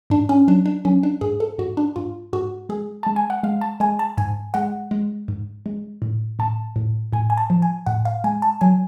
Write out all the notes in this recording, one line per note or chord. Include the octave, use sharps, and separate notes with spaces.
G#2 D4
C#4
F#3 D4
D4
F#3 C#4
D4
G#2 G#4
A4
G#2 F#4
D4
G#2 F4
G#2 F#4
G#3 G#4
G#3 A5
G#5
F#5
G#3 F5
A5
G#3 G#5
A5
G#2 G#5
G#3 F#5
G#3
G#2
G#3
A2
A2 A5
A2
A2 G#5
G#5
A5
F3
G#5
A2 F#5
F5
G#3 G#5
A5
F#3 G#5